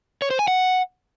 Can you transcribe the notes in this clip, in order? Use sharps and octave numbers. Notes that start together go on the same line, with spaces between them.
C#5
C5
G#5
F#5